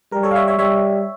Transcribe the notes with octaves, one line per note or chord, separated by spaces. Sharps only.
G3 A#4
A4 C#5
F5
C#5 E5
C#5 E5
G3 C#5 E5